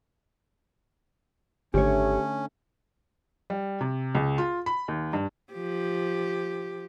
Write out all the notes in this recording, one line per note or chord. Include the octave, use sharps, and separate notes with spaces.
G#1 D3 A3 C#4 G4 C#5
G3
C3
C#2
F4
B5
D#2
G2
F3 G4